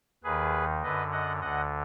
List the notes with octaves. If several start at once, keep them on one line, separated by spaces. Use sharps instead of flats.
D#2 D#3 G#4 B4
F#2 D3 B4 D#5
D#5 F#5
D2 D3 D#5 F#5